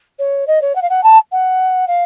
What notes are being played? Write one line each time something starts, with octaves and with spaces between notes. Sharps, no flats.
C#5
D#5
C#5
F#5
F5
F#5
A5
F#5
F5